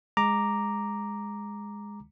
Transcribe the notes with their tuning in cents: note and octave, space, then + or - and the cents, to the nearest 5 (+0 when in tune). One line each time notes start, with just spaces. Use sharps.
G#3 -10 A#5 +0 D6 +0